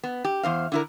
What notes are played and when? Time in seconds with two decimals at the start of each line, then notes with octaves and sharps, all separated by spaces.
0.03 B3
0.25 G4
0.43 E2 C5 F5
0.72 D3 E4 A#4